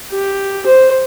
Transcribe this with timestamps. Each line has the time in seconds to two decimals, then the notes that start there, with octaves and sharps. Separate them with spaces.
0.12 G4
0.66 C5